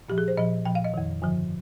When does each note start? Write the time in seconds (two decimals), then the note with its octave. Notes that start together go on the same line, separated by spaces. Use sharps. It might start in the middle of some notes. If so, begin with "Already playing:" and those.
0.08 A#2 F3 G4
0.18 G#4
0.28 C5
0.38 A#2 F3 D#5
0.65 A#2 F3 G5
0.75 F5
0.84 D#5
0.94 F2 D#3
1.22 G2 D3 F3